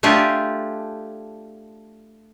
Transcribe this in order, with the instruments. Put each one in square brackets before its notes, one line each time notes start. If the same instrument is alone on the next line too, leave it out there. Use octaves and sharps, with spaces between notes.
[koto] A3 D4 F4 G4 G#4